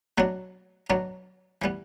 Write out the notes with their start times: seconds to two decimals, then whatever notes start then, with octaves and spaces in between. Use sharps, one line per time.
0.18 B2 F#3 B3 D4
0.90 B2 F#3 B3 D4
1.62 E3 G3 B3